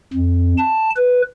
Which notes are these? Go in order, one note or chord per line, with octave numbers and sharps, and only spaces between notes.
F2
A5
B4